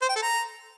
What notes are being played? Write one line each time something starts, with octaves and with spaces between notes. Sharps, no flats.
C5
G5
A4
A#5